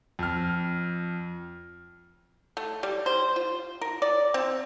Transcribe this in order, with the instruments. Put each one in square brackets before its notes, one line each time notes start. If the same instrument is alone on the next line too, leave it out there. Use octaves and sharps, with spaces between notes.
[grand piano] F2 F6
[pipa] A3
G3
C5
F4
A#4
D5
C4